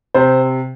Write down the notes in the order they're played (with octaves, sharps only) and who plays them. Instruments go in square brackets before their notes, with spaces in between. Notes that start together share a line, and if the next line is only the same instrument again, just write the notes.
[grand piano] C3 C5